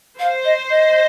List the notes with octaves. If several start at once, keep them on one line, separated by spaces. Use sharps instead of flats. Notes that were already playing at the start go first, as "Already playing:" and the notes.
C5 F5
D#5
D#5